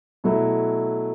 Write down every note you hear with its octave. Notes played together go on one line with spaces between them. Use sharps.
B2 F#3 A3 E4